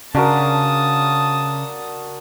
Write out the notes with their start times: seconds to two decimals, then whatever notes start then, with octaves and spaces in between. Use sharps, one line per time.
0.15 C#3 D4 F#4 A#4 A5 D#6